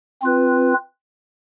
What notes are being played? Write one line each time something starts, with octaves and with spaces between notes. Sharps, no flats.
C4 F4 B4